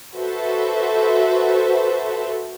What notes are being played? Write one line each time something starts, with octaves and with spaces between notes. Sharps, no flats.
F#4 A4 B4 C5 E5